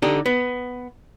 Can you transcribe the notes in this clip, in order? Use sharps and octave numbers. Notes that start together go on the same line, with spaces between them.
D3 D#4 G4
B3